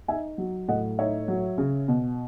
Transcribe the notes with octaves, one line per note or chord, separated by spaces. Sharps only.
D#4 E5 G#5
F#3
A2 D#5 F#5
D#4 C#5 E5
F#3
C#3
B2